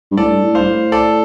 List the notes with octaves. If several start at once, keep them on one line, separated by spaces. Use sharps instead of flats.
G2
A2 A4 D5
G2
A2
G2 C5 F5
A2
A4 D5